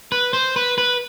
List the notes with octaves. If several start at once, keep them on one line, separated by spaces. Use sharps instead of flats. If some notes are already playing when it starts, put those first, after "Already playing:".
B4
C5
B4
B4